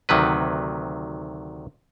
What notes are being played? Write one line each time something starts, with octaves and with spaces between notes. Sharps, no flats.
D2 C3 D#3 F#3 B4